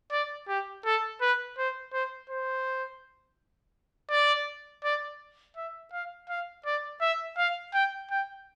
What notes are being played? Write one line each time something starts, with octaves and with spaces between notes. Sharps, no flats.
D5
G4
A4
B4
C5
C5
C5
D5
D5
E5
F5
F5
D5
E5
F5
G5
G5